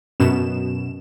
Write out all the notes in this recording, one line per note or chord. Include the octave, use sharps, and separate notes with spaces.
F#2 B2 E7